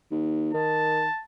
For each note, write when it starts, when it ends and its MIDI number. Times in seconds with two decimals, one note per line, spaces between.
0.11 0.50 39
0.54 1.05 51
0.54 1.23 81